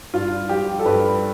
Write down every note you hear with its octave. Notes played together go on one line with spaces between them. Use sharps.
G2 F4
F3 G4
A4
G2 B4